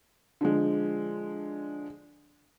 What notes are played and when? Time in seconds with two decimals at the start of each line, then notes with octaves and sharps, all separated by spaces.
0.41 D3 F3 G#3